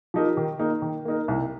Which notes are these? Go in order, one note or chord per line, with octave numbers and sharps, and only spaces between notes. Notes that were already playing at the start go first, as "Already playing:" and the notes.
F3 D#4 G4 A#4
D#3
A#3 D#4 A#4
D#3
A#3 D#4 A#4
C2